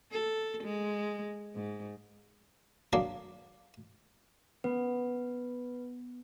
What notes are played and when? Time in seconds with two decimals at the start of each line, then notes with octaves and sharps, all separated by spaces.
0.11 A4
0.63 G#3
1.55 G#2
2.93 F#3 A#3 D4 G#4 A#4 C6
4.64 B3 B4